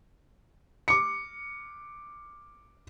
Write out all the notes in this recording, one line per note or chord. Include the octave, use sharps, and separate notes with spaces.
D6 C#7